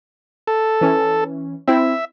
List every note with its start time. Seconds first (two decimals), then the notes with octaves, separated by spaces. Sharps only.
0.48 A4
0.81 E3 C#4
1.68 C4 E4 E5